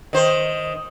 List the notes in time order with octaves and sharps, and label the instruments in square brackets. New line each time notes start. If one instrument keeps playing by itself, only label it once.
[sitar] D#3 C5